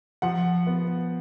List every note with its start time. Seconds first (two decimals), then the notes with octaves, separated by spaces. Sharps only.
0.22 F3 F#5
0.67 B3